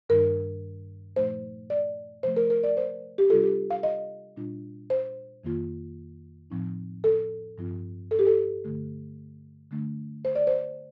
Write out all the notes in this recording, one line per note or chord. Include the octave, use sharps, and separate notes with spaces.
G2 D#3 G3 D4 A#4
A#2 F3 A3 D#4 C5
D5
C3 F3 A3 C5
A#4
A#4
D5
C5
G4
C3 G3 D4 F4 A4
G4
F5
D#5
A#2 G3 D4 F4
C5
F2 D#3 A#3 F4
A2 F3 C4 D#4
A4
G2 F3 C4 F4
A4
G4
A4
G2 D3 A3
D3 A3 D4
C5
D5
C5